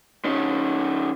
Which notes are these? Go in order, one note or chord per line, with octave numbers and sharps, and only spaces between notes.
D#3 C#4